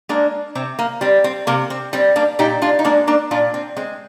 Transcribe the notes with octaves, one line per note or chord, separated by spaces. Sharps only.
G#3 A#3 D4
C3 C4
A#3
G3 C4
C4
C3 A#3
C4
G3 C4
A#3 D4
A#2 D#4 G4
D4 F4
D#4
G#3 A#3 D4
A#3 D4
A#2 D4 F4
C4
G#3 C4